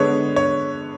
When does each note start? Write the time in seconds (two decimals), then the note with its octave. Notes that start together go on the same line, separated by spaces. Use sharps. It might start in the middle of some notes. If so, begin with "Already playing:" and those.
Already playing: D3 G#3 B3 C#5
0.36 C#5